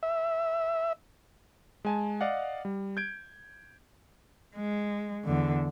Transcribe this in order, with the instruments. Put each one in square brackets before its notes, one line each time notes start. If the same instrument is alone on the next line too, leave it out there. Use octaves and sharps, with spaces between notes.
[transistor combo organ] E5
[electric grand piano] G#3 G#5 A5
D5 D#5 F5 F#5
G3
G6 G#6 D7
[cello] G#3
E2 D3